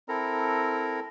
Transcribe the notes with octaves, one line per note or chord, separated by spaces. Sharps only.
C4 E4 A4 A#4 A#5